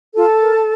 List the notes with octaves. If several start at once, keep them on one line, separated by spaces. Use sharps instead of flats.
F4 A4 A5
A#4